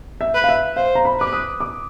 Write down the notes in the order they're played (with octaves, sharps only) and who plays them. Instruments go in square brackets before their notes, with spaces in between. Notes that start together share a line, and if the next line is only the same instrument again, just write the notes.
[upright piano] E5
[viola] B4
[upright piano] F5
E5
[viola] C5 [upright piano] F5
[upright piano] A#5
B5
[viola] B4 [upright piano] D6
[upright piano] D#6
D6